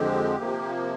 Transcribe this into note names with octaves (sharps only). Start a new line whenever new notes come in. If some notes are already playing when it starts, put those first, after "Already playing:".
Already playing: F2 D3 F3 G#3 C4 G4
C3 F3 A#3